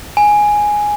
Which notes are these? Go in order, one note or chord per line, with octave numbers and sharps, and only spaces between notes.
G#5